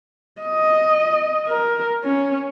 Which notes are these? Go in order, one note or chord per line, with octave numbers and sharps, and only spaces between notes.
D#5
A#4
C#4